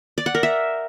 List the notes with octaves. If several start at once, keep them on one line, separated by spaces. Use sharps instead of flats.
D5
F#5
A#4
E5